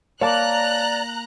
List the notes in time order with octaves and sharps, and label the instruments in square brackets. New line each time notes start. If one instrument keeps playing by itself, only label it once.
[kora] A#3 [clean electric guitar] C#5 F5 A5 [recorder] D5 [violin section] A#5 F#6